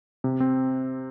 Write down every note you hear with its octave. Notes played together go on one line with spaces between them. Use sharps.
C3
C4